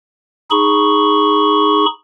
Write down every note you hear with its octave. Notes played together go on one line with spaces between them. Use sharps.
D#4 G#4 B5 C#6